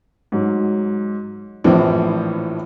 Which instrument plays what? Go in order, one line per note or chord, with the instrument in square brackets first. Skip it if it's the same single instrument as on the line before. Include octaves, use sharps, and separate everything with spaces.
[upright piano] G#2 F#3
[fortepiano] A#1 C4 [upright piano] A2 E3 F3